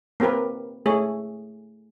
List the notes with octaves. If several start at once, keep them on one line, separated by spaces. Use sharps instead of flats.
A#3 C4 G4 A#4 B4
A3 G#4 C#5